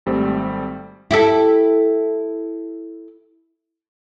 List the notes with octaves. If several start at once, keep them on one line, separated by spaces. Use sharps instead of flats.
G#1 G3 A3 C4
E4 G4 A4